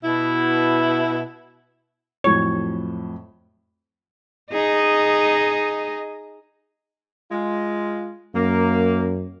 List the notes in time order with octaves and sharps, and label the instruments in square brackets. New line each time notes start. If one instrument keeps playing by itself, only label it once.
[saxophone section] B2 E4
[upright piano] F2 A2 F#3 [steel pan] C#5
[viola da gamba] D#4 G#4 D#5
[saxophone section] G#3 F4
[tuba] F#2 [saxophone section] A#3